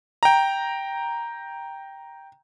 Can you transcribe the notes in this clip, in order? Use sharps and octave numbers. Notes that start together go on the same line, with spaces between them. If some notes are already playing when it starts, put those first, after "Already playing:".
G5 A#5